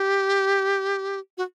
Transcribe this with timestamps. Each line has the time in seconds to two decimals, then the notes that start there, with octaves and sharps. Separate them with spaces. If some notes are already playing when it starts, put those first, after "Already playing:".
Already playing: G4
1.38 F#4